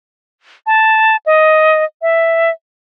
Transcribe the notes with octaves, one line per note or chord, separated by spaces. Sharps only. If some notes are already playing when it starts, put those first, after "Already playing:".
A5
D#5
E5